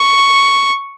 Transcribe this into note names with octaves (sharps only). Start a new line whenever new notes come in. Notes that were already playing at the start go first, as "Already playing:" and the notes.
Already playing: C#6